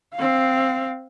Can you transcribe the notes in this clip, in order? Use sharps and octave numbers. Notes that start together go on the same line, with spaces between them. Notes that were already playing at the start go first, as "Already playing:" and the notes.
C4 F5